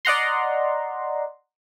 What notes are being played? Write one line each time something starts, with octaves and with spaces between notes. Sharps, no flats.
D5 D#5 F#5 A#5 C6